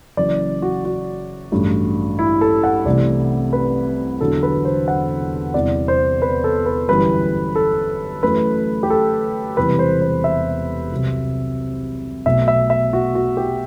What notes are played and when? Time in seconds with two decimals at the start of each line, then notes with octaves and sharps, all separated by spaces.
0.17 F#1 F#2 E3 D5
0.62 F#4
0.85 F#4
1.52 A1 G2 F#3 A3
2.19 E4
2.41 A4
2.64 F#5
2.85 C2 C3 E3 A3 D5
3.53 B4
4.21 E1 E2 D3 F#3 A4
4.43 B4
4.65 C5
4.88 F#5
5.54 E2 C3 E3 G3 D5
5.88 C5
6.22 B4
6.44 A4
6.66 B4
6.89 G1 F#2 E3 G3 B4
7.55 A4
8.22 F#2 E3 A3 B4
8.83 G4
8.90 A4
9.57 E1 E2 C3 E3 G3 B4
9.79 C5
10.02 C5
10.24 E5
10.92 C2 C3 F#3
12.26 B1 B2 A3 E5
12.48 E5
12.70 E5
12.93 F#4
13.15 F#4
13.37 G4